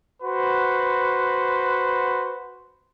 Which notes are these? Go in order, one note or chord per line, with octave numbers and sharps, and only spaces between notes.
F#4 B4 C5